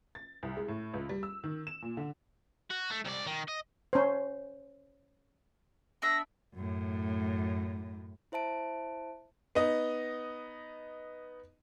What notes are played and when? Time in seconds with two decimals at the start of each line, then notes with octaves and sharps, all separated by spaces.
0.15 A6
0.43 C2
0.57 G#3
0.68 A2
0.94 C#2
1.09 G3
1.23 E6
1.44 D#3
1.67 E7
1.82 A#2
1.97 D3
2.70 F#4
2.90 A3
3.05 C2 D5
3.27 D#3
3.48 D#5
3.93 C#4 C5
6.02 B3 D4 E5 A#6
6.55 F#2 A2
8.32 E4 C5 E5 A5 D7
9.55 B3 D#4 D#5